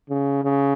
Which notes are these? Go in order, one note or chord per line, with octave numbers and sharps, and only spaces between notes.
C#3
C#3